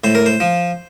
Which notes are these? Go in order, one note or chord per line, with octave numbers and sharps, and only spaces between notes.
A2 C5
A#4
C5
F3